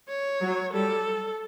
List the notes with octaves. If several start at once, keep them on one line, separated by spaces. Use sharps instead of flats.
C#5
F#3
G3 A4